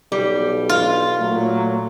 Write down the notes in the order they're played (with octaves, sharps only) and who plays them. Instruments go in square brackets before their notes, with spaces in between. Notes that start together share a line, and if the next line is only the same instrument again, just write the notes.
[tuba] B1 [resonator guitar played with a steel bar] G3
[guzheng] F4
[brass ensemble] A#2 F#3 A3